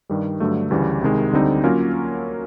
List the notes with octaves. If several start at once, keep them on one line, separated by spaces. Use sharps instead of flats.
G2 D#3 G3
G2 D3 F#3 A3
D2 C#3 E3 G3
C2 C3 D#3 G#3
D2 D3 G3 C4 D#4
F#3 A#3 C#4 F4 A#4